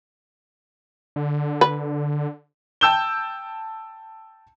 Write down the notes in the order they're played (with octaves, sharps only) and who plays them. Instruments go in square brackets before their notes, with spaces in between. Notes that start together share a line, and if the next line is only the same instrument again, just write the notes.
[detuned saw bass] D3
[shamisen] B4
[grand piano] G5 A5 E6 G6 E7 G7